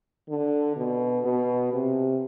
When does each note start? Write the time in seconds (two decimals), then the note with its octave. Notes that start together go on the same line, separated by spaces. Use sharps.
0.29 D3
0.76 B2
1.25 B2
1.73 C3